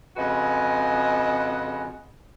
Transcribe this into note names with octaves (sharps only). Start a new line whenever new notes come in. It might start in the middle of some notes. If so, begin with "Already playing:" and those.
F2 C#3 G#3 F#4 B4 D#5